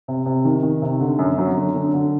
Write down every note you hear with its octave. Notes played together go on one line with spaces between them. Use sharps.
C3
C3
D#3
D#3
C3
D3
F#2
F#3
D3
D3
D3